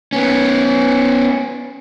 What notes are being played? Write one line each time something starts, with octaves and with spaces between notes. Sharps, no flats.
B3 C#4